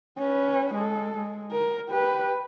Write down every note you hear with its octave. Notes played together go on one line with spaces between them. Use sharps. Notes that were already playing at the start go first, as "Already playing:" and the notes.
C#4 B4
G#3 A4
G#3
A#4
G4 B4